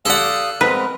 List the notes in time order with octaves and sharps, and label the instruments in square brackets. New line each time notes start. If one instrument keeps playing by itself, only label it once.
[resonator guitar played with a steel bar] D3 G4 D5 [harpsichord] A4 F#5 [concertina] F5 D#6 F6
[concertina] G#3 C4 A#4 [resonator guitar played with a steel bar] B3 [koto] B4